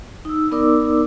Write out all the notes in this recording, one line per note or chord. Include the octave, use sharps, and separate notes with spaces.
D#4 E6
B3 D#4 A#4 D5 D6 E6